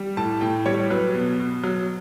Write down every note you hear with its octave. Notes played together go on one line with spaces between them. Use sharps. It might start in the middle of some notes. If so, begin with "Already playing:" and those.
Already playing: G3
A2 A5
A2 G5
G3 C#5
F#3 B4
B2
B2
F#3